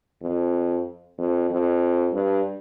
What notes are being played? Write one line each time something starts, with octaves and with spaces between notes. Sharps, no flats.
F2
F2
F2
G2